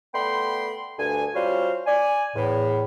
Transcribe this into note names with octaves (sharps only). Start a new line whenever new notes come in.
A3 B3 D5 G5 B5 C6
D2 G2 A4 G#5
G3 C#4 F4 F#4 C5 F5
D5 G#5
E2 A2